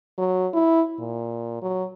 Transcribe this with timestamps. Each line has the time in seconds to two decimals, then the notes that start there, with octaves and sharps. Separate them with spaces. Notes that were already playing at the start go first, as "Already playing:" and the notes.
0.18 F#3
0.53 E4
0.99 A#2
1.62 F#3